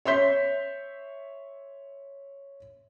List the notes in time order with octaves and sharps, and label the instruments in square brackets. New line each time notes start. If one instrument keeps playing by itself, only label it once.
[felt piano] C#5 E5 C6 G6 B6